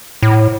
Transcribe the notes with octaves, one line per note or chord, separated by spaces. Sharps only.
A2